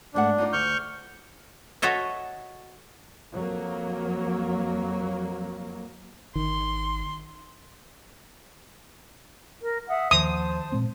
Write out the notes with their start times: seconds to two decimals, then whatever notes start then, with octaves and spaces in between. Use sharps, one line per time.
0.14 G#2 A3 D4 F#5
0.38 D#4 F4 D5
0.53 D2 C#6 F6 G6
1.82 F#4 A4 C#5 D#5 E5
3.33 F2 F#3 A#3
6.36 G#1 D#3 C6
9.61 A#4
9.88 E5 F#5 D#6
10.11 D#2 D#3 F3 C5 A5 D#6
10.72 A#2 G#3 C4